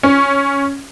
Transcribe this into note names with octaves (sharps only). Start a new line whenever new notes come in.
C#4